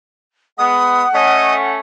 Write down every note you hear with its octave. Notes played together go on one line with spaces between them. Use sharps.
G#3 B3 F#5 D#6
A3 C#4 D#5